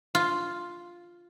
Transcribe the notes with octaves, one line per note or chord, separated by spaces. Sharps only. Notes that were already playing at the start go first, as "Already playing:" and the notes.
F4